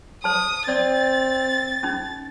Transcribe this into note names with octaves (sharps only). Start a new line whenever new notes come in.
C5 A5 D#6
C4 D5 A6
C#4 D#4